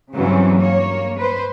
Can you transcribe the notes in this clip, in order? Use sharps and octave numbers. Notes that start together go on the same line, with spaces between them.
G2 C#3 E3 F#3 C4 C#4
A#3 C#5
B4 C5